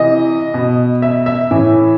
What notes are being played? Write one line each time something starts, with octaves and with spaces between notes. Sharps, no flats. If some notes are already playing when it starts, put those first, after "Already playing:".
Already playing: C3 E3 D#5
B2
E5
E5
A2 E3